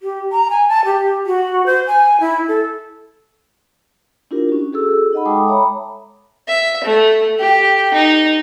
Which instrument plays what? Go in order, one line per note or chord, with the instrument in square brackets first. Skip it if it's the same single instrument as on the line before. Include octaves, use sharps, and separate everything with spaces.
[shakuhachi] G4
A#5
G#5
A5
G4
F#4
C5
G#5
E4
A4
[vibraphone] D4 E4 F4 G4 A#4
C#4 F#4
F#4 G#4 A4 E6
D#4 D#5 F#5 B5
G#3 A4 G5 A5 D6 D#6
C#5 E5 A#5 B5
[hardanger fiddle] E5
A3
G4
D#4